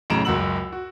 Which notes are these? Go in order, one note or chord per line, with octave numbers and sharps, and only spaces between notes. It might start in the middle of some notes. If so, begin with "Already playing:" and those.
B1 A2 C#3 A#5 D7 E7
F#1 C#2 F#4 E6 F#7
F#4